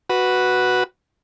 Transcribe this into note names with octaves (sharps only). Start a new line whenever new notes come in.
F#4 B4